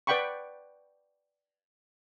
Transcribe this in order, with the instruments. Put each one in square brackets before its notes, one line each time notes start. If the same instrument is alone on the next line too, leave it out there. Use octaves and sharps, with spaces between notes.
[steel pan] B4 D5 F#5 G5 B5 C#6